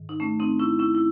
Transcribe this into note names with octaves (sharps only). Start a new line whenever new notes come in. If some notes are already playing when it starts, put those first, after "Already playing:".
Already playing: G#2 D#3
D#4
A3 C#4
C4 D#4
C#4 E4
C#4 E4
E4